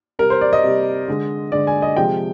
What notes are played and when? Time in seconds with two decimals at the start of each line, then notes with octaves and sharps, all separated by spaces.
0.19 C3 G3 A#4
0.30 C5
0.41 D5
0.53 D#5
0.63 C3 G3
1.08 D3 G#3
1.52 D3 G#3 D5
1.67 G#5
1.82 D#5
1.96 C3 F3 G#3 G5